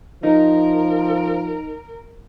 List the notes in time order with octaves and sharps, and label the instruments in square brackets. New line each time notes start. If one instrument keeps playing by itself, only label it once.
[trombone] F3 [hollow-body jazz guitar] D#4 [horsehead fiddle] A#4